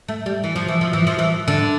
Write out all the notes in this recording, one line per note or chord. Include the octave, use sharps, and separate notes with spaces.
A3
G3
E3
F3
E3
F3
E3
F3
E3
D3